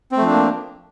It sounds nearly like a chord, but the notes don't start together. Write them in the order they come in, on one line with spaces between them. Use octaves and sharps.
C4 A3 F3 D4 A#3